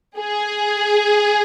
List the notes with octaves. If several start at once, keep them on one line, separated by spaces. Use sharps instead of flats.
G#4